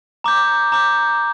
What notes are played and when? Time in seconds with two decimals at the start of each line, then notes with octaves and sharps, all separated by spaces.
0.24 A#5 D6 G6
0.72 A#5 D6 G6